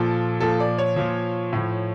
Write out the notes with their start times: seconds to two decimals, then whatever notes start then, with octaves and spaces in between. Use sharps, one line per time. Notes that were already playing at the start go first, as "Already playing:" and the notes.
Already playing: A#2 F3 A4
0.40 A#2 F3 A4
0.60 D5
0.78 C#5
0.96 A#2 F3
1.53 A2 F3